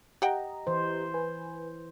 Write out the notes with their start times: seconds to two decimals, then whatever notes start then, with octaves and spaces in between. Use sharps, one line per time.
0.22 G4 D#5 F#5 G5 A#5
0.67 E3 C5
1.14 B4 G#5